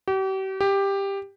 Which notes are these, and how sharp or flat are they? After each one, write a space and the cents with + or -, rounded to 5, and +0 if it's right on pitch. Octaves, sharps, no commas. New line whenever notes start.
G4 -40
G4 +10